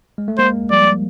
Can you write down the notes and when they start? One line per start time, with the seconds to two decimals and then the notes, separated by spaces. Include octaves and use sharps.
0.18 G#3
0.28 A3
0.38 G#3 A#3 C5
0.70 F3 G3 D5